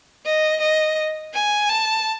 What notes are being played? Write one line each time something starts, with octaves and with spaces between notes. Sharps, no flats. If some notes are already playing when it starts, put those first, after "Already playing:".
D#5
D#5
G#5
A5